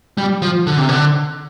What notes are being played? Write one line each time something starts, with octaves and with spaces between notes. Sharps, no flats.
G3
F3
D3
C3
D3